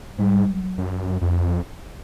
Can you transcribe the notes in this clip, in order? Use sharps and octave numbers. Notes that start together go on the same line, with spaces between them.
G#2 G3
F#3
F#2
F2